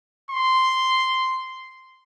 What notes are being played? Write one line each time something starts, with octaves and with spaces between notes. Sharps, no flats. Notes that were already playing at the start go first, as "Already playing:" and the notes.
C6